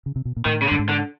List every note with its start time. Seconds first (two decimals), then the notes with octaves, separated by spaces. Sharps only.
0.06 C#3
0.16 C3
0.25 B2
0.36 A#2
0.45 A2 D#3
0.62 C#3
0.67 D3
0.72 G2
0.79 G#2
0.89 D3